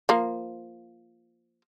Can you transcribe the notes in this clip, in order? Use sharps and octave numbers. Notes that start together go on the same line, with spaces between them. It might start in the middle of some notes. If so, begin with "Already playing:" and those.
F3 A#3